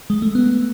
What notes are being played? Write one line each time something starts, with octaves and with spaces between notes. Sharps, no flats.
G#3
A3
B3